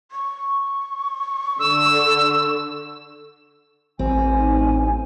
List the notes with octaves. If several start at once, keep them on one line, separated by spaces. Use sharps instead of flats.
C#6
D3 E6
A1 C4 G#5
D#4